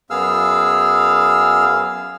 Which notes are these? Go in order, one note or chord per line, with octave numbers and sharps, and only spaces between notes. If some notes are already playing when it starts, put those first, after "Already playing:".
F#2 B3 G#4 F5 E6 F6